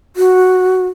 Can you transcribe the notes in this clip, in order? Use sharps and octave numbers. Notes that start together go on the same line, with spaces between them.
F#4